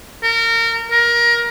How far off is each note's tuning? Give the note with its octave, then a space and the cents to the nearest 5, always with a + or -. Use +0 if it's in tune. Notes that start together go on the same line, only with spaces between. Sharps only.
A#4 -25
A#4 +20